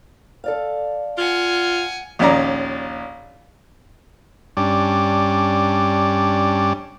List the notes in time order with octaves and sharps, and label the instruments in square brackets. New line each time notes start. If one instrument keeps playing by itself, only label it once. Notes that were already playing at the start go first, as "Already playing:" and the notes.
[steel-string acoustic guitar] A4 D5 F5
[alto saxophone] F4 [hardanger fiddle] F#5 G#5
[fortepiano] A#1 D#2 C#4 D5 A#5
[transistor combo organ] G2 G3 C#4 D4 D5